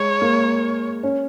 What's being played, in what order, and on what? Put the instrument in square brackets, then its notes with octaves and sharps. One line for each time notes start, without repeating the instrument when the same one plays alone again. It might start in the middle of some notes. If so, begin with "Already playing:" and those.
Already playing: [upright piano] G#3 [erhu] C#5
[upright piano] A#3
C#4